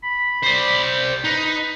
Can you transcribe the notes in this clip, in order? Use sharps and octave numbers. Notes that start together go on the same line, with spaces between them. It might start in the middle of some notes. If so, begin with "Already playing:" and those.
B5
C5 D5
G5
D#4 B4